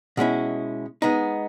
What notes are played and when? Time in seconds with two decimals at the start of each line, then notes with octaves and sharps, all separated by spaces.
0.17 B2 G#3 C#4 E4
1.02 G#3 B3 D#4